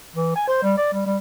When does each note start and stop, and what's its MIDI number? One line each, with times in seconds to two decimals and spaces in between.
0.16 0.35 52
0.36 0.47 80
0.48 0.58 72
0.63 0.76 55
0.77 0.92 74
0.93 1.05 55
1.06 1.17 55